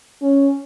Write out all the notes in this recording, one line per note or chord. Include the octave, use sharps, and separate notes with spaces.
C#4